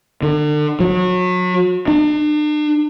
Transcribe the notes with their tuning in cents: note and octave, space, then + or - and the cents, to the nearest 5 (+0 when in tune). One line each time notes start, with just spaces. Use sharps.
D3 +35
F#3 -30
D4 +40